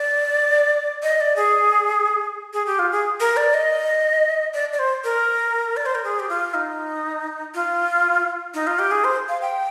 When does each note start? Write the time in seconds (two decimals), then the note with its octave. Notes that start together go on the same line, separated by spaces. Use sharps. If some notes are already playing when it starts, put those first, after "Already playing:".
Already playing: D5
1.03 D#5
1.20 D5
1.36 G#4
2.53 G#4
2.66 G4
2.79 F4
2.92 G#4
3.20 A#4
3.37 D5
3.54 D#5
4.54 D5
4.73 D5
4.79 C5
5.04 A#4
5.77 D5
5.86 C5
5.95 A#4
6.04 G#4
6.19 G4
6.29 F4
6.54 D#4
7.54 F4
8.54 D#4
8.67 F4
8.79 G4
8.91 G#4
9.04 C5
9.29 F5
9.42 G5